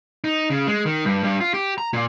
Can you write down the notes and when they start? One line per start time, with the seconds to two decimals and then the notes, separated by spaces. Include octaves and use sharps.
0.24 D#4
0.50 C#3
0.67 G#3
0.86 D#3
1.05 G2
1.23 G2
1.41 F4
1.54 G4
1.78 A#5
1.93 A#2